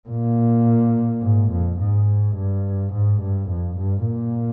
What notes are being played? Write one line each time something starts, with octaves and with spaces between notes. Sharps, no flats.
A#2
G#2
F2
G#2
G2
G#2
G2
F2
G2
A#2